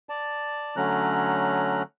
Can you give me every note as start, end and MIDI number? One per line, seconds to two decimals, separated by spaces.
0.09 0.76 74
0.09 0.76 81
0.76 1.83 50
0.76 1.83 54
0.76 1.83 57
0.76 1.83 61
0.76 1.83 82
0.76 1.83 90